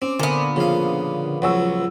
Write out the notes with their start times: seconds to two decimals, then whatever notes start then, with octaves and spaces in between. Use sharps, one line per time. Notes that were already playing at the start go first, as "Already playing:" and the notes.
0.02 C4 C#4 D6
0.19 A#2 D3 B3 G#5
0.56 C#3 F3 F5
1.42 C#2 F3 F#3 F#5 C#6 E6